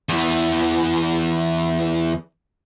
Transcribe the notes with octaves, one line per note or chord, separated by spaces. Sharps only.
E2 E3